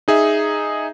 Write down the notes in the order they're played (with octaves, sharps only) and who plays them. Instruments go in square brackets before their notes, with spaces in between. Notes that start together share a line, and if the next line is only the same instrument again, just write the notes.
[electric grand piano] D#4 G#4 E5